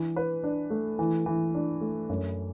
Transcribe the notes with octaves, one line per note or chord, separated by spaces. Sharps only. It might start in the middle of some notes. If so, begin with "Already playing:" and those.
Already playing: E3 D4
B4
D4
A3
E3
E3
D4
A3
F#2